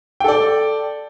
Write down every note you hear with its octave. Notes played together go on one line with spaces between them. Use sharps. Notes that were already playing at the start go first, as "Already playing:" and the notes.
A4 D5 G5